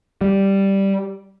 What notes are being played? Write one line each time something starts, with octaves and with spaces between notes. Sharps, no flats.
G3